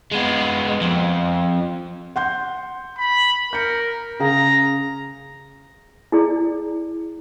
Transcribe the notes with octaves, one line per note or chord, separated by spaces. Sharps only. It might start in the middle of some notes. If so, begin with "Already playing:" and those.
G#3 B3
F2
F#5 C6 G6
B5
A#4 G6 C#7
C#3 G#4 F5 A#5
E4 G#4 D5